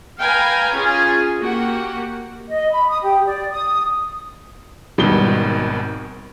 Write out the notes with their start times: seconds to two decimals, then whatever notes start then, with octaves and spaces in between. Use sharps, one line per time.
0.20 B4 F5 G5 G#5 A#5
0.74 C#4 F4 G#4
1.40 A#3 F#4 G4 F#5
2.49 D#5
2.72 B5
2.89 D#6
3.02 G4
3.26 D5
3.51 D#6
4.98 G#1 B2 D#3 G3 G7